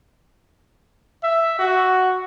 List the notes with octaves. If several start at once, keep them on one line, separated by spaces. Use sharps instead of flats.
E5
F#4